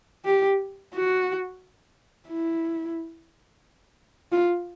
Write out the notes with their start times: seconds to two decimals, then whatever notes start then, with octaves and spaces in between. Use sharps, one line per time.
0.25 G4
0.94 F#4
2.28 E4
4.32 F4